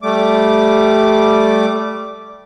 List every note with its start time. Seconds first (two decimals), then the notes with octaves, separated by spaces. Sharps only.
0.03 G3 A3 D6